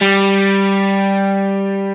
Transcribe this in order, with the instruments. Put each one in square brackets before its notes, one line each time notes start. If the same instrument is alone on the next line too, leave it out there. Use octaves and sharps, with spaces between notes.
[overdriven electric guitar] G3